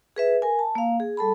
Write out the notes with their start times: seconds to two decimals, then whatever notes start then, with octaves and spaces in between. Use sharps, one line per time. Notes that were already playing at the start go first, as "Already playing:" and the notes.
0.16 G#4 B4 E5
0.42 A#4 G#5
0.59 A5
0.75 A#3 F5
1.00 G#4
1.17 G3 A4 A5 B5